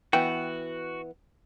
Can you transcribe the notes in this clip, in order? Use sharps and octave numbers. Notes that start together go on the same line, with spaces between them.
E3 B3 F#4 G5